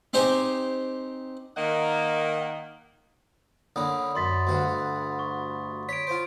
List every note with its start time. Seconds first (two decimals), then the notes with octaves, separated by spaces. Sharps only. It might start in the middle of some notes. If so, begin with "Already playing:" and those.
0.13 C4 D#4 G4 C5 G#5
1.57 D#3 A#3 D#5 F#5
3.76 D3 A#3 C#4 B5 D#6
4.16 F#2 C6 A6 B6
4.47 D2 G2 F#4
5.19 C#6
5.89 C#5 B6 D7
6.07 F4 C5